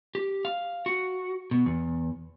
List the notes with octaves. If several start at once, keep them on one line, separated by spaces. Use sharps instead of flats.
G4
F5
F#4
B2
E2